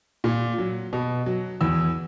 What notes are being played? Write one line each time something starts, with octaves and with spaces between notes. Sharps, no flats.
A#2
F#3
B2
F#3
E2 E6